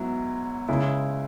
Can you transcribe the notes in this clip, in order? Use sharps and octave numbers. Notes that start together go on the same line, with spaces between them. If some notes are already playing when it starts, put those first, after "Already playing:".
Already playing: G#2 F#3 B3 E4
C#2 C#3 G#3 E4